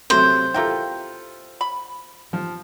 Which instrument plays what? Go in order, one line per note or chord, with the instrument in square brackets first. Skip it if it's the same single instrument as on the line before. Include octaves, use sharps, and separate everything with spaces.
[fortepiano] C3 F#3 A3 [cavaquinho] C5
[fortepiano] E4 F4 A4 [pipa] G4 A#4 G5
[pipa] B5
[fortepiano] F3